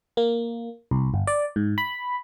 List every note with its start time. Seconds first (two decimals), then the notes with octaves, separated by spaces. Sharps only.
0.17 A#3
0.91 C2
1.14 G1
1.27 D5
1.56 G#2
1.78 B5